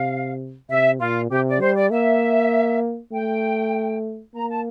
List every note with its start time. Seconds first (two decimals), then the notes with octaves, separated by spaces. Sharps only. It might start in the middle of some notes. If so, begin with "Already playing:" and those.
Already playing: C3 F5
0.69 C3 E5
1.00 A#2 F4
1.30 C3 G4
1.49 D5
1.60 G3 C5
1.76 D5
1.90 A#3 E5
3.12 A3 G5
4.34 A#3 A#5
4.49 A5